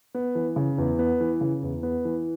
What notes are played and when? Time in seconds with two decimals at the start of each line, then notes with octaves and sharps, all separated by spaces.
0.14 B3
0.35 E3
0.56 C#3
0.78 E2
0.99 B3
1.20 E3
1.41 C#3
1.63 E2
1.83 B3
2.05 E3